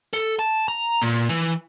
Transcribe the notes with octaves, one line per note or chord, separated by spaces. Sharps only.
A4
A5
A#5
A#2
E3